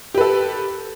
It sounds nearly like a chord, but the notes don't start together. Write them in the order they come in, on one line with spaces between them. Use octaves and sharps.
G4 B4 A4